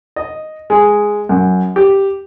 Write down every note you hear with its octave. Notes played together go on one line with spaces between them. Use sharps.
D#5
G#3
F#2
G4